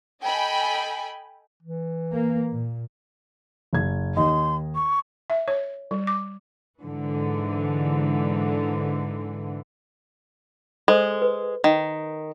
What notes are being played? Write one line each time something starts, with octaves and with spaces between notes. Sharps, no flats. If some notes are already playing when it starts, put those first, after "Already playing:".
A4 D#5 G5 G#5 B5
E3
A#3
A#2
F#1 G#6
D#2 D#5 C6
C#6
E5
C#5
G3
D6
G#2 D3 E3
G#3 A4 C5
B4
D#3